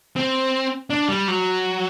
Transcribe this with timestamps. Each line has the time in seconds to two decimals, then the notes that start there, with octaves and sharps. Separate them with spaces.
0.16 C4
0.90 D4
1.08 G3
1.28 F#3